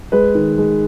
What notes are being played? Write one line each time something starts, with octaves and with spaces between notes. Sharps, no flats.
G#3 B4
D#3
G#3